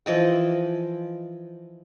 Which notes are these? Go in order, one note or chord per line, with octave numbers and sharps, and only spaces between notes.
E3 F3 D#5 G5